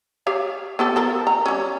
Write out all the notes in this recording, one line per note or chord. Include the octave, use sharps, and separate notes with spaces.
G4 C#5 F5
B3 G4 A4
F3 A4 A#4
A#5
G3 C#4